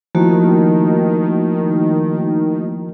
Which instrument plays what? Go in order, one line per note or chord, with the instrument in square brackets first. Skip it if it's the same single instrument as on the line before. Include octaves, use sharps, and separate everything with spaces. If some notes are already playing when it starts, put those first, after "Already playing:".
[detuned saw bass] D#3 [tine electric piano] F3 E4 [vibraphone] A3 A#3 F#4